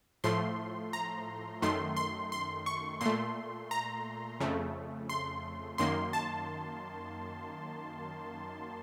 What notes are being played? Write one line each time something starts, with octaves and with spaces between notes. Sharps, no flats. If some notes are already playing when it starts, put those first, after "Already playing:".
A2 F3 A3 C6
A#5
F#2 D#3 A3 C6
C6
C6
C#6
A#2 A3 C6
A#5
F2 C#3 A3
C6
F#2 D#3 A#3 C6
A5